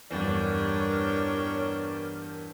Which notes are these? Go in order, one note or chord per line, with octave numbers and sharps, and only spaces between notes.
E2 G2 G3 D4 A#4 C#5 G5